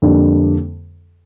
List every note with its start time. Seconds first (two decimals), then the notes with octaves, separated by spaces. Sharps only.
0.02 F2 D3 G3 A#3 D4